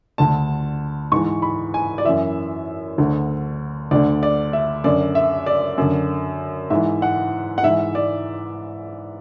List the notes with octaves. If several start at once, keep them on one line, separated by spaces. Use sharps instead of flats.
D2 D3 A5
G#2 E3 C#6
B5
G#5
D5
F#2 E3 E5
D2 D3
D2 D3 D5
D5
E5
F#2 D3 D5
E5
D5
F#2 D3
G#2 E3 E5
F#5
F#5
G#2 E3 E5
D5